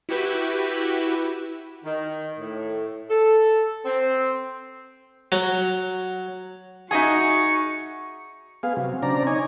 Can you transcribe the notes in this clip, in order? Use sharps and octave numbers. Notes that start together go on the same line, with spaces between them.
E4 F#4 G4 B4 E5
D#3
A2
A4
C4
F#3
D#4 F#4 G#4 D#5 E5 G#5 C#6
B3 G#4 F5
C3 F#3
C#3 C4 D4 D5 A#5
D#4 C#5 G#5